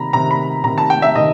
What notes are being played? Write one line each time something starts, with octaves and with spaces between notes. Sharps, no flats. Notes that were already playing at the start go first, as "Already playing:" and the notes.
Already playing: C3 D#3 A#5 B5
C3 D#3 A#5
B5
C3 D#3 A#5
A5
G5
E5
C3 D#3 D#5